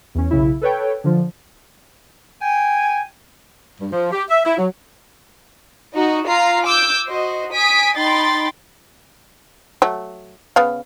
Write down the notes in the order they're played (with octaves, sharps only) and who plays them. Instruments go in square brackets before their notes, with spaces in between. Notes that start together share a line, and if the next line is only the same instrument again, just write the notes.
[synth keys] E2 C#4
B1 C#3 E4
A4 B4 C#5 G5
D3 F3
[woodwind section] G5 G#5
[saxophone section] G2
F3
G4
E5
E4
F#3
[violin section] D#4 F#4 D#5
F4 F5 A#5 C7
D6 E6 G6
F#4 C5 D#5
G#5 D#6 B6 D7
D#4 G5 B5 C6 A6
[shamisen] F#3 A3
C#3 B3 F5